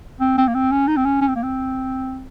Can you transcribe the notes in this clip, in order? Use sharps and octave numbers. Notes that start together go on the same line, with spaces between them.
C4
C4
A#3
C4
C#4
D#4
C4
C#4
C#4
C4
A#3
C4